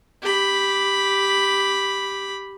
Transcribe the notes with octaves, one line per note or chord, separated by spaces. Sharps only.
G4 B5